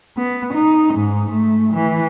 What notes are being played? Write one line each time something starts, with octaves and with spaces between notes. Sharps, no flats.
B3
D#4
G#2
A3
E3